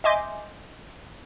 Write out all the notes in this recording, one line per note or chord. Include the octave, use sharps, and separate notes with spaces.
D#5 E5 G#5 C6 D6 G6